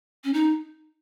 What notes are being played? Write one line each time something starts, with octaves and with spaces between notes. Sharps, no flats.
C#4
D#4